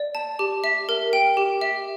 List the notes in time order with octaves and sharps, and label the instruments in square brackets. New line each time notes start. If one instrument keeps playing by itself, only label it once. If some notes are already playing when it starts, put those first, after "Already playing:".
Already playing: [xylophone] D5
A5
G4
E5
A#4
G5
G4
E5